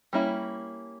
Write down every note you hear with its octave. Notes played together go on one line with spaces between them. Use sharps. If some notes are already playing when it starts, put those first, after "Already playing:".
G3 A#3 C#4 E4